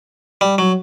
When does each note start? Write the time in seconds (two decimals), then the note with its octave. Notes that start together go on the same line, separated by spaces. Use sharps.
0.41 G3
0.58 F#3